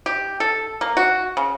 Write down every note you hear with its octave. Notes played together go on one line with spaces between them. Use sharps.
G4
A4
A#3
F#4
C#3